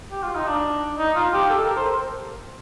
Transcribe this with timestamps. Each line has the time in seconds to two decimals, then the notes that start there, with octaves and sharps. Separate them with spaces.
0.11 G4
0.23 F4
0.35 D#4
0.48 D4
0.98 D#4
1.16 F4
1.33 G4
1.50 A4
1.64 A#4
1.76 C5